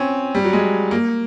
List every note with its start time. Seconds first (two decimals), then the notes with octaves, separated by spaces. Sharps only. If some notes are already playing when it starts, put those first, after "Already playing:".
Already playing: C4 C#4
0.35 G3
0.45 F#3
0.53 G#3
0.91 A#3